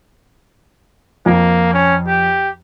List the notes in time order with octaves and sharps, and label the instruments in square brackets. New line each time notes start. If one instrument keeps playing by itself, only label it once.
[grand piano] F2 [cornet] A#3
[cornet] C#4
G4